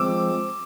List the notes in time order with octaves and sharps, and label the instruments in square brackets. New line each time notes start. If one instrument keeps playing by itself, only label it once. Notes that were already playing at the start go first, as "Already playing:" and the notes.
Already playing: [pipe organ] F3 G#3 C4 [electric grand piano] D6 E6